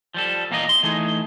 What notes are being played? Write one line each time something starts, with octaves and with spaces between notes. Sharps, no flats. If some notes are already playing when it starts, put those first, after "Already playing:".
F3 G3 A4
E2 A#2 A#3 A#4 D#5
C6
E3 A3 D#4 G#4